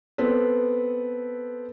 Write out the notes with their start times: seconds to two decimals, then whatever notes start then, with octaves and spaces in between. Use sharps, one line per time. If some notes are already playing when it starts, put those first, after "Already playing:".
0.18 B3 C4 A4 B4